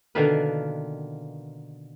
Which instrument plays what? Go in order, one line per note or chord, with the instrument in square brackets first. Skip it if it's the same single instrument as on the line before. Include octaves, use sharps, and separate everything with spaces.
[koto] B2 D3 D#3 A#3 F4 B4